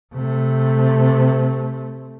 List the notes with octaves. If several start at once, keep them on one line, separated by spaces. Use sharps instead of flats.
C3 A3